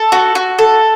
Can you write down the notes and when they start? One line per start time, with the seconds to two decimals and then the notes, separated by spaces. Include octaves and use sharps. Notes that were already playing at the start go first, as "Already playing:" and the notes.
Already playing: A4
0.12 F#4
0.35 F#4
0.59 A4